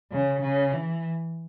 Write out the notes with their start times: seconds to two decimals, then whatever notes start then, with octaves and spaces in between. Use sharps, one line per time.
0.12 C#3
0.41 C#3
0.72 E3